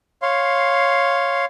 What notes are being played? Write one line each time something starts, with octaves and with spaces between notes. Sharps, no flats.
C#5 F5 C6